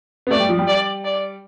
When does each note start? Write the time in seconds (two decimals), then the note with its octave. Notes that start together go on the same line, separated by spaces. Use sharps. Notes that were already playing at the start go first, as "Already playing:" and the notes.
0.27 B3
0.31 A3 D5
0.40 G3
0.49 F3
0.59 G3
0.68 D5
1.04 D5